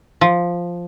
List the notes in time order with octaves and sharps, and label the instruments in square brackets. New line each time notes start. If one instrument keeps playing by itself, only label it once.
[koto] F3